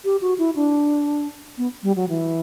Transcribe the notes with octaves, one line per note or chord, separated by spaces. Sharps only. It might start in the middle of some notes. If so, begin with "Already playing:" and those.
G4
F#4
E4
D4
B3
G3
F#3
E3